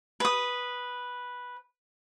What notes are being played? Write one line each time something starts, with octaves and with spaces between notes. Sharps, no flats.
B4 D#6